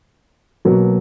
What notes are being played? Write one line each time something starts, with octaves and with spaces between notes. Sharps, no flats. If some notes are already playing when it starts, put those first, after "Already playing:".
B2 F#3 A#3 F#4